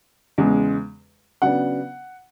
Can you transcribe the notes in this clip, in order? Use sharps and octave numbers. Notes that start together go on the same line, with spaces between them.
E2 C#3 G#3
C#3 F#3 B3 D4 F#5